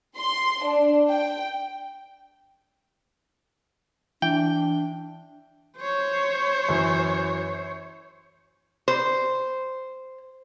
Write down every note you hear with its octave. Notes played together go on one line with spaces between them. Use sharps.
C6
D4
G5
E3 D4 G5
C5 C#5
F#2 E3
C5